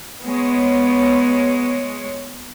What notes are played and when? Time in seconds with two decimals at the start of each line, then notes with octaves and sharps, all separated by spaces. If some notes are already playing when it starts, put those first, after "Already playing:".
0.25 G#3 B3 C#5